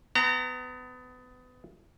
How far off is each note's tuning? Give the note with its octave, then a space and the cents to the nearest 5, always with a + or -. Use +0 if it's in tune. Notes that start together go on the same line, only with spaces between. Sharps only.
B3 +30 F#5 +40 A#5 -30